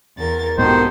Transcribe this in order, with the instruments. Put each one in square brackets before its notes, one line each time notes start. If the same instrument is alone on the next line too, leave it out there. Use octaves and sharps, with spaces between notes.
[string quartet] E2 A#4 A6
[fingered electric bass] B1 G#2 B2 [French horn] D#3 [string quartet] B3 G4 A4 [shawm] C5